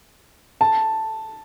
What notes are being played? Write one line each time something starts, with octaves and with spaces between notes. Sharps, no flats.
A5